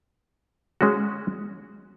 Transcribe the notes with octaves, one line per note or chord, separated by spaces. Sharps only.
G#3 C#4 F#4